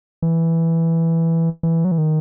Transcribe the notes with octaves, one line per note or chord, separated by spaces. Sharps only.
E3
E3
F#3
E3
D#3